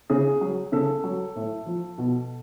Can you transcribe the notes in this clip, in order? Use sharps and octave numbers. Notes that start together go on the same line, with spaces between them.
C#3 G#4
F#3
C#3 A4
F#3
A2
F3
B2